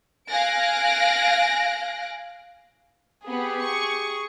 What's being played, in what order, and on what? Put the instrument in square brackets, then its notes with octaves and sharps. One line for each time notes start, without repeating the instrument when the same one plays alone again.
[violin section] F5 G#5 F#6 A#6 D7
[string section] B3 [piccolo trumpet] G4 [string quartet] G#4
[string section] C#6